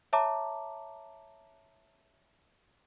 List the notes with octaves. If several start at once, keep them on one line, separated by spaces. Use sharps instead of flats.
C#5 E5 A5 A#5 D6